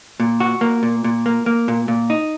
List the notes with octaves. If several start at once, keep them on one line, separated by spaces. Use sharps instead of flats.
A#2
F#4
A#3
A#2
A#2
A#3
A#3
A#2
A#2
D#4